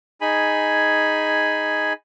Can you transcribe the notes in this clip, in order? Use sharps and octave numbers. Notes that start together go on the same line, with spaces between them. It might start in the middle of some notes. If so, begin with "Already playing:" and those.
D#4 G#4 G#5 B5